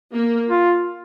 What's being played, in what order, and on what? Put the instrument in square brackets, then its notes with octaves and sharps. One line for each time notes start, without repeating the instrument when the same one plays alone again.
[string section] A#3
[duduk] F4